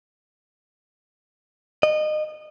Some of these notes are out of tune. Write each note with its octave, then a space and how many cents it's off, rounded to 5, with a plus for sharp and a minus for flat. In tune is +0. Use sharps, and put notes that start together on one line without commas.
D#5 -25